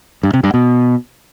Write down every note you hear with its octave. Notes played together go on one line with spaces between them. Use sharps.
G2
C3
G2
B2